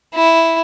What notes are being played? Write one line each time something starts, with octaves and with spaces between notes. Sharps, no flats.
E4